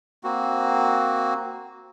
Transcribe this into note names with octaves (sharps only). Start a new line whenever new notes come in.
A#3 C4 F#4